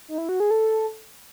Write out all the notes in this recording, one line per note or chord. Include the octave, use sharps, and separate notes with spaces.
D#4
E4
F#4
G#4
A4